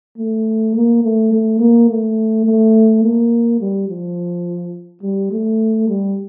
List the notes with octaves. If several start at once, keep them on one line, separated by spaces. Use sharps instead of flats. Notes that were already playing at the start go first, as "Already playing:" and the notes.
A3
A#3
A3
A3
A#3
A3
A3
A#3
G3
F3
G3
A3
G3